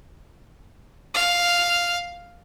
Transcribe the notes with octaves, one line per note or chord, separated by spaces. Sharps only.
F5